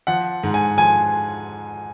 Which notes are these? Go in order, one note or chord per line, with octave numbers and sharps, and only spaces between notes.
F3 F#5
G#2
G#5
F3 G#5